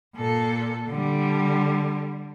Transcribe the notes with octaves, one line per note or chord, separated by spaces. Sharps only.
A#2 A4
D3 G3